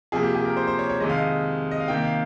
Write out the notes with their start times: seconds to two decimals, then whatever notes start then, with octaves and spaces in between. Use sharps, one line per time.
0.12 C3 F3 A#3 G#4
0.23 G4
0.35 G#4
0.45 A#4
0.57 C5
0.67 C5
0.79 C#5
0.90 C#5
1.00 F2 C3 D#3 G#3 D#5
1.09 F5
1.18 D#5
1.71 D#5
1.80 F5
1.88 C3 D#3 A#3 G5
2.04 F5